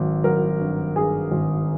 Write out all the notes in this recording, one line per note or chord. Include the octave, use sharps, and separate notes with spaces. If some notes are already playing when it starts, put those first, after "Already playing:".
Already playing: G#1 F#3
F#3 A#4
G2
G2 G#4
G#1